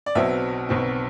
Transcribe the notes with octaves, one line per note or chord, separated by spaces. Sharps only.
D5
B1 B2 F#3 C4 E5
B1 B2 F#3 C4